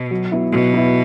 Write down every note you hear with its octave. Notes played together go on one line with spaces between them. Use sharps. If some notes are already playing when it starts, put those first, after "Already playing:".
Already playing: B2
F#3
B3 E4
B2 F#3
B3 E4